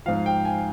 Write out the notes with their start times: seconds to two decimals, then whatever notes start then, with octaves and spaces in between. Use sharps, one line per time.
0.06 G#2 F3 F5
0.26 G5
0.45 G#5